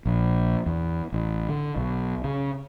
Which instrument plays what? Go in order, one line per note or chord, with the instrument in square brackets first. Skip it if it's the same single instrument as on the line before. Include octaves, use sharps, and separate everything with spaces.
[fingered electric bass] A#1
E2
A1
D3
B1
C#3